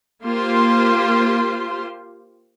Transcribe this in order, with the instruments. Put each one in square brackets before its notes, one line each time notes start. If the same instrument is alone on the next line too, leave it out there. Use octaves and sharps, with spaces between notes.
[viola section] A#3 F4 G4 C5 C6